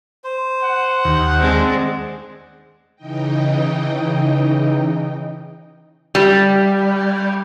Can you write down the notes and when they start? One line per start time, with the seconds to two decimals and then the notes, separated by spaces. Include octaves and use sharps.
0.24 C5
0.63 F#5
1.05 D#2
1.39 G#3 C4 D4
2.96 C#3 E3 D#4 D#5 G5
6.15 G3